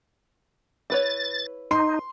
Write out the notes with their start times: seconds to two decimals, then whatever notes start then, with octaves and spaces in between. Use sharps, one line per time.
0.90 E4 B4 C#5 A6
1.71 D#4 C6